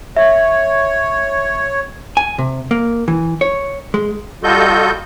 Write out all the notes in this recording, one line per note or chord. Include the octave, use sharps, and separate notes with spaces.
C#5 E5
G#5
C3
A#3
E3
C#5
G#3
G3 F4 F#4 A4 D#5 G6